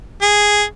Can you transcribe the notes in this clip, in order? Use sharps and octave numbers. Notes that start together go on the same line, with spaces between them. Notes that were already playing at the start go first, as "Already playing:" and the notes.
G#4